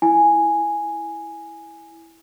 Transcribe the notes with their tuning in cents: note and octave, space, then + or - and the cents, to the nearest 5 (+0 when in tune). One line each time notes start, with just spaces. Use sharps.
E4 +0 G#5 +0